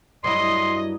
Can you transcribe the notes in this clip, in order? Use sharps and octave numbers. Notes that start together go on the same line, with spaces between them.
G2 F#3 E4 D#5 C6